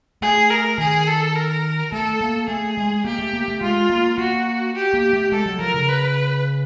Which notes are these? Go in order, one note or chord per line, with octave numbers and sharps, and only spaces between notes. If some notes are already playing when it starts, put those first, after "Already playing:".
A3 G#4
A#4
D#3 G#4
A4
A#4
A3 A4
A#3
A3 G#4
G#3
A#3 G4
A3
A#3
A3
G#3 F4
A#3
A#3 F#4
G4
A#3
A3
G#3 A4
F#3
F3 A#4
C#3
B4